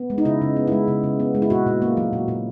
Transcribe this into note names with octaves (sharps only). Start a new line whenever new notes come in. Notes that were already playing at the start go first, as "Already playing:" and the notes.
Already playing: B3
G#3
D#4
C#3 E4
C#3
B3
G#3 E4
C#3
C#3
B3
G#3
E4
A#2 F#4
A#2
A#3
F#3
A#2
A#2